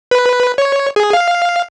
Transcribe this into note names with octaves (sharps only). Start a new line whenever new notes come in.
B4
C#5
G#4
F5